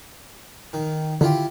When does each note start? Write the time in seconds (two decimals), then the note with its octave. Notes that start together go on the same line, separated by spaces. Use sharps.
0.73 D#3
1.21 D3 D#3 E4 F4 G4